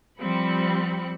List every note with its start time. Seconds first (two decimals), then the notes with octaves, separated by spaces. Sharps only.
0.19 F3 G3 C4 B5 C#7